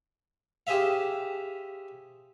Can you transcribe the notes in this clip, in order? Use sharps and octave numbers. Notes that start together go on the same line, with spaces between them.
G4 G#4 C5 E5 F5